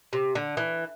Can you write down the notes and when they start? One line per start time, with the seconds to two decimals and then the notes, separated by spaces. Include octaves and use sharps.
0.13 C3
0.35 D3
0.57 E3